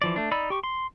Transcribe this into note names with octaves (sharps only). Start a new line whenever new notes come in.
E3 F3 D5
A3 D4
D#4 D5 B5 E6
G4 C#6
C6